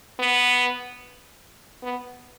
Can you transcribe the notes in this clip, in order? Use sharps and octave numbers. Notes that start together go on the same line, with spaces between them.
B3
B3